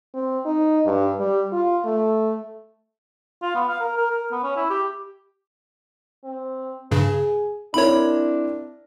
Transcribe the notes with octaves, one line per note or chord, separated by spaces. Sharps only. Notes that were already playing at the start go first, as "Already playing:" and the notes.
C4
D#4
G2
G3
F4
A3
F4
B3
F5
A#4
A#4
A#4
B3
C#4
E4
G4
C4
G2 C#3 G#4
C4 D4 E4 A#4 C#5 B5